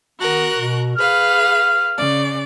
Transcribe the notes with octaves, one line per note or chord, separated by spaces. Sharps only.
D#3 B3 F#4 A#4 F#6
B2
G#4 B4 F5 F6
C#3 D5